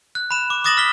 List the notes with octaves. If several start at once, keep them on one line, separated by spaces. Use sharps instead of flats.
F#6
B5 E7
D6
D6 D#6 A6 A#6 E7 F#7
F6 B6 G7